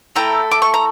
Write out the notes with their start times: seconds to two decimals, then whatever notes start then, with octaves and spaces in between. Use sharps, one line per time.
0.16 A3 E4 A4 G5 A#5
0.51 D6
0.62 C#6
0.74 A#5